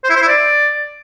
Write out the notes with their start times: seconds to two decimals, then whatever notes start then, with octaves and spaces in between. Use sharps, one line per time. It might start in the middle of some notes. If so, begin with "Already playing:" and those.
0.04 C5
0.10 E4
0.16 C5
0.22 E4
0.28 D5